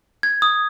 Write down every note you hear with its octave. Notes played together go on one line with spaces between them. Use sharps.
G#6
D#6